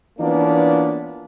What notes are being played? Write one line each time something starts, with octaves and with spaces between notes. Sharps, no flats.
E3 A#3 B3 C#4 D4 F4